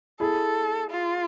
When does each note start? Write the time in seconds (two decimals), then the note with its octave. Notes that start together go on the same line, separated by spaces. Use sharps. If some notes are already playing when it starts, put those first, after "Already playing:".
0.20 E4 G#4 A4
0.91 F4